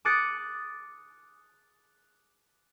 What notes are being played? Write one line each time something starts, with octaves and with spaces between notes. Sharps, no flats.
D6 D#6 F#6 A6 C#7